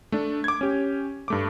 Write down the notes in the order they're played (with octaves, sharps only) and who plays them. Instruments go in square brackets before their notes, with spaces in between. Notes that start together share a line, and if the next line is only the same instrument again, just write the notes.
[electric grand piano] A3 D4
D6 G#6
C#4 G4
G2 A3 D6